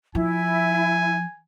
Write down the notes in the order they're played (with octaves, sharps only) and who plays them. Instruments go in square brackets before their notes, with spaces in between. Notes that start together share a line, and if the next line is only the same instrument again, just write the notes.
[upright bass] F3 [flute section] E4 [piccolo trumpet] G#5